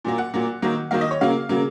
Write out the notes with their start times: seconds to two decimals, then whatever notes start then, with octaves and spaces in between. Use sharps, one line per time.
0.04 A#2 F#3 A#3
0.18 F#5
0.34 A#2 F#3 A#3
0.62 D#3 F#3 A#3
0.91 D#3 F#3 A#3 F5
1.01 D#5
1.11 C#5
1.21 C#3 F#3 A#3 F5
1.49 C#3 F#3 A#3